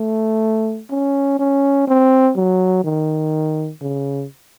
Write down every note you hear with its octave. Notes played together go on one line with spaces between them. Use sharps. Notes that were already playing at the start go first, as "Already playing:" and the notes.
Already playing: A3
C#4
C#4
C4
F#3
D#3
C#3